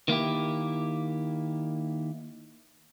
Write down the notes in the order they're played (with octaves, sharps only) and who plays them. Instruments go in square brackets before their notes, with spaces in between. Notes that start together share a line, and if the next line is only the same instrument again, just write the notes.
[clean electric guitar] D#3 A#3 E4 G4